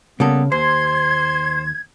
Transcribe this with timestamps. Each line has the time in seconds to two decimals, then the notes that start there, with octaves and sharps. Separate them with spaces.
0.20 C#3 G3 A#3 B3 A4
0.52 D#2 C5 C6 G#6